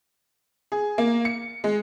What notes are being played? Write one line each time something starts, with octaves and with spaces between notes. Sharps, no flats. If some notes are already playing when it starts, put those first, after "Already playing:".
G#4
A#3
C#7
G#3